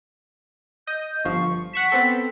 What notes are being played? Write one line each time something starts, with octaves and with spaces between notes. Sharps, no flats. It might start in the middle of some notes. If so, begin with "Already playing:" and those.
D#5 G6
G1 F3 C#6 C7
F#5 C#6 B6 E7
B3 C4 A4